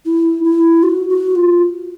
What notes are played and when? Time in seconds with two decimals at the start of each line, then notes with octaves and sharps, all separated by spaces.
0.06 E4
0.44 E4
0.83 F#4
1.10 F#4
1.35 F4